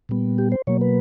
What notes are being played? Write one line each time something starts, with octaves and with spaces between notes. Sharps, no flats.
A#2 G3 B3
G4
C5
B2 F#3 A#3 C#5
B4